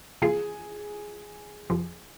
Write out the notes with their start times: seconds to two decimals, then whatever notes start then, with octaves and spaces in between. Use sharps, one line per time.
0.22 C3 F3 A#3 F4 G#4
1.70 F2 C3 F3